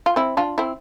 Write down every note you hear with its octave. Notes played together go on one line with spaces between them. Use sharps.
F4
C4 E4
D4 F4
C4 E4